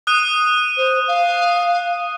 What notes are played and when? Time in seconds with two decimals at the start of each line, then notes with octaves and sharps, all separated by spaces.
0.07 D#6 F#6 D#7
0.77 C5
1.08 F5